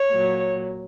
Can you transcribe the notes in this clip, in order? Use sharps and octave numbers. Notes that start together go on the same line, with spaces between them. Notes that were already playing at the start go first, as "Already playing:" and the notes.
Already playing: C#5
A#2 F#3